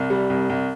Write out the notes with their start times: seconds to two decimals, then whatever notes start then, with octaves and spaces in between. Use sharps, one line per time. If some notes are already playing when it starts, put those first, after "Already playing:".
Already playing: C2
0.10 G3
0.30 C2
0.49 C2